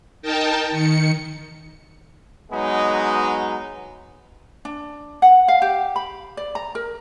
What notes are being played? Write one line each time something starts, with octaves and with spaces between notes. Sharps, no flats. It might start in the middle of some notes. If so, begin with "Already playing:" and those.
D#4 A#4 G5 A5
D#3 C#7
F#3 G#3 B3 D#4
D4
F#5
F5
G4
B5
D5
A#5
A#4